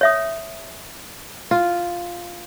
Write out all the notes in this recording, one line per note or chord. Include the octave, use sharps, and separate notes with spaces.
C#5 E5 D#6
F4